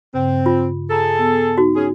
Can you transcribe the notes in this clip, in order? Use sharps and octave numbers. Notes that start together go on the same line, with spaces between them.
G2 C#3 C4
F4
G#4 A4 A#5
B3
D#4 F#4
C#4 G#4